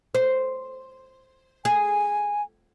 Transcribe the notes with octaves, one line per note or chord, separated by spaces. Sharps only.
C5
G#4 G#5